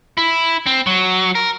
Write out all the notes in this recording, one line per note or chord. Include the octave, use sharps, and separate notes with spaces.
E4
C4
F#3
A#4